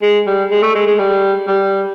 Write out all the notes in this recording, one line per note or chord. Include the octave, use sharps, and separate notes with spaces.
G#3
G3
G#3
A3
G#3
G#3
G3
G3